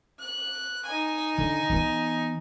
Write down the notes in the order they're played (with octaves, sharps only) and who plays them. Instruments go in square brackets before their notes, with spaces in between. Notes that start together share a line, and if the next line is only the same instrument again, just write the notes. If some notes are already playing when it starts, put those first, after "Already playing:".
[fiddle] F#6
D#4 G#5
[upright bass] D3
E3 B3